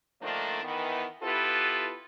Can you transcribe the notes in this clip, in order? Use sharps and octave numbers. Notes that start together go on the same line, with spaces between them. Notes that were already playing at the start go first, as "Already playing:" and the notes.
D3 D#3 F3 A3 A#3 D4
D#3 E3 B3
B3 E4 F4 G4 A4 B4